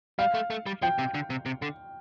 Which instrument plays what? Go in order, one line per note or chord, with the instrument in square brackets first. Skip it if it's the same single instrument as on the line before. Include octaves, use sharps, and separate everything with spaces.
[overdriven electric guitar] G3 [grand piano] F5
[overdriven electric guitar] A3
A3
G3
[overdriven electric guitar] F3 [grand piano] G5
[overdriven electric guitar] C3
D3
C3
C3
D3